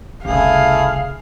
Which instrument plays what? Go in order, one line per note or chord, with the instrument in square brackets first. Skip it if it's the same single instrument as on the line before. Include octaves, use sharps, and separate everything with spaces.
[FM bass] E1 [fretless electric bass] C2 C#3 [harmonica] A3 E4 G#4 [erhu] F5